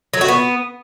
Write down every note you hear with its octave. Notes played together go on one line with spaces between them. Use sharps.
F#3
F#4
B3